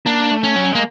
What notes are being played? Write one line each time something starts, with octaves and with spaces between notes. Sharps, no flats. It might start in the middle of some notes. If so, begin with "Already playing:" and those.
A#3 D4
A3
C#4
F#3
G#3 A#3